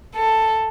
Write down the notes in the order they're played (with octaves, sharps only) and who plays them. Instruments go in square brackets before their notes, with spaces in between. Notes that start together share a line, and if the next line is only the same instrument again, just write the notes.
[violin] A4